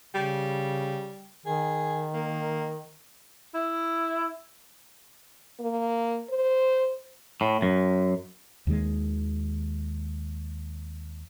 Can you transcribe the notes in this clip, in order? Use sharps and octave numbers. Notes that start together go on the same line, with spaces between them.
C#3 G3
D#3 G#4
A#3
E4
A#3
C5
A2
F#2
D#2 D#3 F#3 G#3